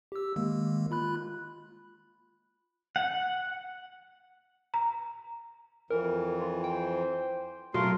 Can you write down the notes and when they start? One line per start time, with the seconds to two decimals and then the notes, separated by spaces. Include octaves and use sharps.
0.12 G4 E6
0.36 D#3 G#3 A#3
0.91 F4 B5 F#6
2.96 F#5
4.74 A#5
5.90 F2 E3 A#4
6.41 F4
6.64 C5 G5
7.74 B2 F#3 A3 F4 A#4 C6